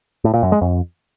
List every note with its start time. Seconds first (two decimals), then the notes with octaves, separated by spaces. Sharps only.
0.24 A2
0.34 A#2
0.43 F#2
0.52 G#3
0.61 F2